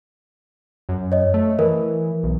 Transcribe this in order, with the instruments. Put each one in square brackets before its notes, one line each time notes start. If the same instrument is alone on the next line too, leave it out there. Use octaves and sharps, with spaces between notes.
[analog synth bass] F#2
[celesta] C#5 D#5
[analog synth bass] A3
[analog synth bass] E3 [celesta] A#4
[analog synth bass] B1